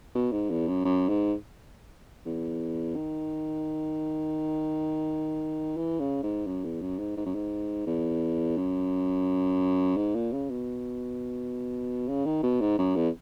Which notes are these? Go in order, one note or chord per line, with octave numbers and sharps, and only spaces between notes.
B2
G#2
E2
F#2
F#2
G#2
E2
D#3
E3
C#3
G#2
F#2
E2
F#2
G#2
G#2
F#2
G#2
E2
F#2
G#2
A#2
C#3
B2
C#3
D#3
B2
G#2
F#2
E2